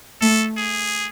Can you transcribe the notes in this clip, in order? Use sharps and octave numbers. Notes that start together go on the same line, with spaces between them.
A3 A4
G#4